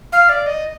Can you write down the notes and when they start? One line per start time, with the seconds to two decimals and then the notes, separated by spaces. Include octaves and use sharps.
0.12 F5
0.29 D5
0.46 D#5